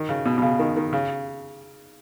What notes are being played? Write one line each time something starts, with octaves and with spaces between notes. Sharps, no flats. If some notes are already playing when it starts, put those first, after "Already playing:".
Already playing: D#3
C#3
B2
B2
C#3
D#3
D#3
C#3